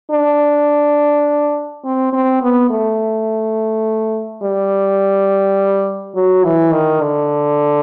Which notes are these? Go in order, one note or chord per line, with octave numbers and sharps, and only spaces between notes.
D4
C4
C4
B3
A3
G3
F#3
E3
D#3
D3